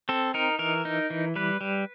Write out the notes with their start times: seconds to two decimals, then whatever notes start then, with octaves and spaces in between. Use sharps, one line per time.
0.09 C4 A4
0.34 D#4 A#4
0.59 E3 A#4
0.85 D#4
1.10 E3
1.36 G3 B4
1.61 G3